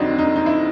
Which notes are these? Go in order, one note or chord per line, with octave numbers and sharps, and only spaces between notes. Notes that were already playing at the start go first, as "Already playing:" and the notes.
Already playing: F2 D3 F#3 C4 D4 D#4
D#4
D#4
E4